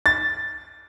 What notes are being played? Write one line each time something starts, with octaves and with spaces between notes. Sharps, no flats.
A6